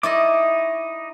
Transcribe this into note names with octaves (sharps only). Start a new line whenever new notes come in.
D#4 E4 D5 D#5 C#6 D6